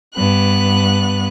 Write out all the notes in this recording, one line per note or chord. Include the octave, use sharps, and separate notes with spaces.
G2 B3 F#6